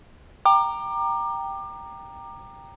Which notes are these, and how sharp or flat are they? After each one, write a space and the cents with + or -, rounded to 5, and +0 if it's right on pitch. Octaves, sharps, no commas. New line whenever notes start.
G5 +0 A#5 +0 D6 +30